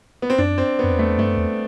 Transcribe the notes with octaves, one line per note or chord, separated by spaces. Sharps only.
B3
C4
F#2 D4
C4
F#2 B3
E2
A3
G2 A3
F#2
E2